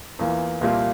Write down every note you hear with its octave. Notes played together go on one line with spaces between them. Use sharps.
E2 E3 A#3 F4
C2 A#2 G3 A#3 F4